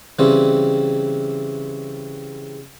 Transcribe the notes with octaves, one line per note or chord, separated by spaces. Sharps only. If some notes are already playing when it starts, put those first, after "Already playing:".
C#3 E3 G3 C4 C#4